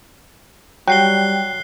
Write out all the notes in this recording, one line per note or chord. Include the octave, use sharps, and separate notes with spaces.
F#3 G3 G5 F#6 C7 G7